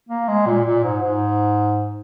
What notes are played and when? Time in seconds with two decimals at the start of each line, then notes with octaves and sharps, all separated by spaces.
0.09 A#3
0.28 G#3
0.46 A#2
0.65 A#2
0.84 G#2
1.02 G#2